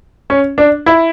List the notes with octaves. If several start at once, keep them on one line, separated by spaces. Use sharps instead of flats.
C#4
D4
E4